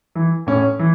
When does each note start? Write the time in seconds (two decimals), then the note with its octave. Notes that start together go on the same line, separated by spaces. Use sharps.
0.15 E3
0.47 A2 C#4
0.79 E3